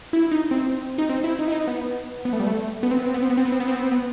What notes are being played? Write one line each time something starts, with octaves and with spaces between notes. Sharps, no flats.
E4
D#4
C4
D#4
C4
E4
D#4
E4
D#4
B3
B3
A3
G3
A3
B3
C4
B3
C4
B3
C4
B3
C4
B3
C4
B3
C4
B3
C4
B3